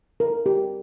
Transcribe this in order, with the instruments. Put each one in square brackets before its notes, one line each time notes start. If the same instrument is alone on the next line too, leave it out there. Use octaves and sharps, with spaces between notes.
[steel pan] A#4
G4